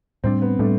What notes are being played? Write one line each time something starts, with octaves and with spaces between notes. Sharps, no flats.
A2 G3 C4 D4
B3
A2 G3 A3 D4